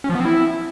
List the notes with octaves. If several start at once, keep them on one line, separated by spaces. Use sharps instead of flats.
C#4
F3
B3
C4
E4